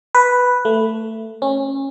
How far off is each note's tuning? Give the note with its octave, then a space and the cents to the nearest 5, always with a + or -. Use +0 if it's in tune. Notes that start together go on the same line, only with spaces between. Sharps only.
B4 +0
A3 +15
C#4 -25